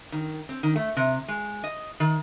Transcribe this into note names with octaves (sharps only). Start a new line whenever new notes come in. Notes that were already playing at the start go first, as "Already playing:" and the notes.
D#3
C4
D#3
A3
C3
G#3
D#5
D#3